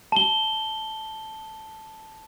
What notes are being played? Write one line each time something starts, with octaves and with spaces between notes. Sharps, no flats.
A5 G7